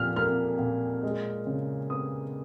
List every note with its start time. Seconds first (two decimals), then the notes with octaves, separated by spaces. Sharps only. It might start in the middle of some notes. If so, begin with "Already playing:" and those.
Already playing: A#2 F3 F6
0.16 A#3 F6
0.59 A#2
1.03 G#3
1.47 C#3
1.90 B3 D#6